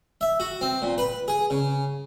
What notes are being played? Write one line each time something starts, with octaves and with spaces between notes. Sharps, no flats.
E5
F#4
C4
A#2
B4
G#4
C#3